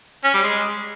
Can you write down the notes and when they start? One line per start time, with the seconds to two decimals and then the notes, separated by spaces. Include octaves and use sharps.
0.24 C#4
0.34 G3
0.43 G#3